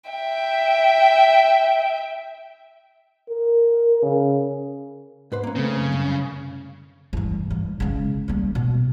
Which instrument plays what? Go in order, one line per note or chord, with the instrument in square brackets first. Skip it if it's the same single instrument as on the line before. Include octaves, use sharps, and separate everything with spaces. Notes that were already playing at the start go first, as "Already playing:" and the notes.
[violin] E5 G5
[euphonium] A#4
C#3
[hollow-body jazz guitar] G#2 B4 C5
A#3 C#4
[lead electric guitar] C#3 [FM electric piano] A3 C4
[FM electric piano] F#2
[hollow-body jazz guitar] C2
[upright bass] G2 E3
G2
C#3 G#3
G3 A#3
B2